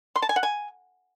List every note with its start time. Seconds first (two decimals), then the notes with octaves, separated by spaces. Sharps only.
0.16 C6
0.22 A5
0.29 G#5
0.36 F#5
0.43 G#5